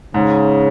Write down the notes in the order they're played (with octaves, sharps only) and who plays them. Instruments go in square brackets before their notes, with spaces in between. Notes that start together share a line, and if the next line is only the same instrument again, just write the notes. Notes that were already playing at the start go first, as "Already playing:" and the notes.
[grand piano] G#2 [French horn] C#3